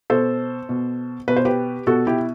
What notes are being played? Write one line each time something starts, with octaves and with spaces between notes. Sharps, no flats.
B2 A4 C5
B2
B2 B4
C5
G4 B4
B2 F#4 A4
E4 G4